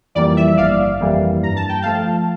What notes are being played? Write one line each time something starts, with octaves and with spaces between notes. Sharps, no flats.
F2 E3 G3 A#3 D5
E5
E5
G1 D5 F5
F2 E3 G3 A#3
G2 A#5
A5
G5
F3 A3 F5 A5